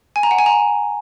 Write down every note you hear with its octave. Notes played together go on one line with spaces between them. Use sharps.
G#5
A#5
F#5
G#5
A#5